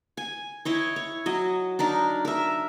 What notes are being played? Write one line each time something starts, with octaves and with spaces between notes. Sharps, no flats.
G#5
E4 C#5 D#5
C#5
F#3 D#5
D4 D#4 A#4
A#4 E5